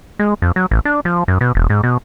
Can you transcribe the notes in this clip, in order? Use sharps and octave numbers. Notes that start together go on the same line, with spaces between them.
G#3
F2
F#3
A1
D4
F3
F#2
B2
E1
G#2
B2